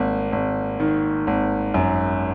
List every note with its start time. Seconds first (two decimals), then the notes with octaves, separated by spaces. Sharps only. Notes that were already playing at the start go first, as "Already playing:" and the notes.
Already playing: G#1 A#3
0.32 G#1
0.80 D#3
1.27 G#1
1.74 F#2